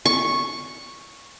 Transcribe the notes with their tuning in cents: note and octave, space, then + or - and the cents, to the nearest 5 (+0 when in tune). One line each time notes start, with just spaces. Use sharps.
C#6 -5